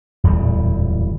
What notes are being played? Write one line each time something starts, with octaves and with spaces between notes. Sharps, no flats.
D1 E2 A#2 G3